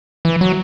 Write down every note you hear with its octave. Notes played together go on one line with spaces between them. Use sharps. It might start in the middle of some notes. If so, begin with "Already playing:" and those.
E3
F#3